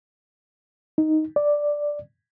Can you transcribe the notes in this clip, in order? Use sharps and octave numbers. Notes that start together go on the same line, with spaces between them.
D#4
D5